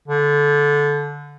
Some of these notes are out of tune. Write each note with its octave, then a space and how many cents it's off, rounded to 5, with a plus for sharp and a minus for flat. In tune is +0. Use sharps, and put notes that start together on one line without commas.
D3 -20